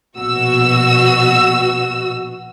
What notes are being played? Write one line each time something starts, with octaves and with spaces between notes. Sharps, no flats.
A#1 B2 F#4 E6